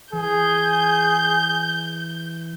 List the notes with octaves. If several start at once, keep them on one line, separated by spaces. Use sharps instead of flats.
E3 G#4 G6